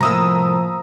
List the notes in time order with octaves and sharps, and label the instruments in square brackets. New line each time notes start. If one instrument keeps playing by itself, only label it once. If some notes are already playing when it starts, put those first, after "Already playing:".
[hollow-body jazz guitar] C2 A2 A#3 [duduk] F3 [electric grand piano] A#5 D#6 E6